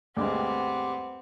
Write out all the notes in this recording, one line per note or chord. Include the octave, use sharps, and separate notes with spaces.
D2 G2 G#3 B3 C4 G4